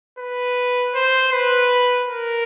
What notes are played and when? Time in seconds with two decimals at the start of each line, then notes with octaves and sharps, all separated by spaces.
0.19 B4
0.94 C5
1.32 B4
2.08 A#4